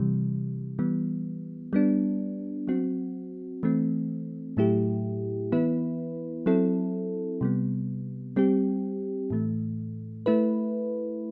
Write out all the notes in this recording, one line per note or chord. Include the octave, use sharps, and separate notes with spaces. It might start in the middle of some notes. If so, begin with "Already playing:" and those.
Already playing: C3 E3 G3
E3 G3 B3
G3 B3 D4
F#3 C4 F#4
E3 A3 C4
A2 F#3 A3 E4 G4
E3 B3 E4 B4
F#3 C4 E4 A4
C3 G3 B3
G3 C4 G4
A2 E3 A3
A3 E4 B4